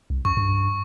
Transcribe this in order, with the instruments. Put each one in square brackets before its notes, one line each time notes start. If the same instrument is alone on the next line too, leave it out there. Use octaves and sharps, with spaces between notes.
[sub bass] C2
[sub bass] F#2 [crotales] C#6
[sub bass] G2